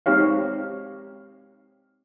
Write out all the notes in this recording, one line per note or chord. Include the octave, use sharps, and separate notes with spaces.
G#3 C4 D#4 G4 C#5 F5